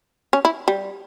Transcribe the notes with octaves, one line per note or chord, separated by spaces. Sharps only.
C#4
E4
G3